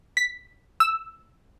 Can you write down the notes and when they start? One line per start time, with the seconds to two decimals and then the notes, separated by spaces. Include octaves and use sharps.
0.17 B6
0.80 E6